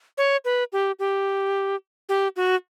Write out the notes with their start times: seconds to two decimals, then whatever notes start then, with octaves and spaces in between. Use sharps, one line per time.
0.18 C#5
0.45 B4
0.73 G4
0.99 G4
2.09 G4
2.36 F#4